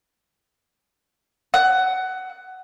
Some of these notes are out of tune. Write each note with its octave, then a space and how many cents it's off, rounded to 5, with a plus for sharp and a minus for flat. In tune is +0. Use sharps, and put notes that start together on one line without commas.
F#5 +15